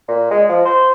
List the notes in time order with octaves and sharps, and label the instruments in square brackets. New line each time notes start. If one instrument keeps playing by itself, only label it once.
[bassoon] A#2
G#3
F3
C5